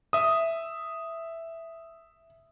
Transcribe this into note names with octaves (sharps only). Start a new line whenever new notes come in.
E5 D#6